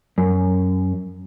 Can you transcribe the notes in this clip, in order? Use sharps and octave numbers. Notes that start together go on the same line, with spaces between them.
F#2